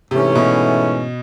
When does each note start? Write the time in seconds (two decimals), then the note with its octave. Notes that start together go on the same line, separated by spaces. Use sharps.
0.11 G#2 C3 E3 A3 C#4
0.35 B2